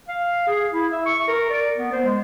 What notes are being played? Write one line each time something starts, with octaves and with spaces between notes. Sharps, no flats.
F5
G#4
E4
E5
C#6
A#4
D5
B3
C5
G#3